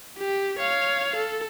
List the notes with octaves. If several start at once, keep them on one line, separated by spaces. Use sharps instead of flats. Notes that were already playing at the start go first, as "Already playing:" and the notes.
G4
C#5 F5
A4